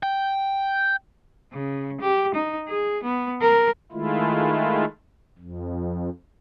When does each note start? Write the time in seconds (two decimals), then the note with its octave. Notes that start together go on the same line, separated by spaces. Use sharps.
0.03 G5
1.53 C#3
2.01 G4
2.34 D#4
2.68 G#4
3.04 B3
3.41 A#4
3.92 D#3 G#3 A3 E4 F4
5.38 F2